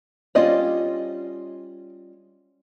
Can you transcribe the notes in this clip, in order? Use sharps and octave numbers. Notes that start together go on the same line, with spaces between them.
G3 C#4 F4 D5 D#5